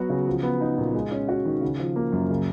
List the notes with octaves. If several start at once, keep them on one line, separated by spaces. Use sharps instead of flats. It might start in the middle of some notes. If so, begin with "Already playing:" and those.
Already playing: F#3 B3 F#4
C#3
F3
B3
D#4
A#2
G#3
C#4
F#4
D#3
C#3
F3
A#3
F#2
C#3